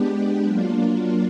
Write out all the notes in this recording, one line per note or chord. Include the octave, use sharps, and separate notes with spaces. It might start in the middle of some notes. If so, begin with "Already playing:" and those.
Already playing: G#3 B3 D4 G4
F#3 A#3 D4 F4